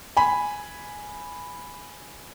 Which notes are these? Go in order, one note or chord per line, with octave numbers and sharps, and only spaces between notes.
G#5 B5